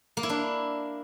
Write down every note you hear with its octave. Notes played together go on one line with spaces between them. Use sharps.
A#3
E4
D4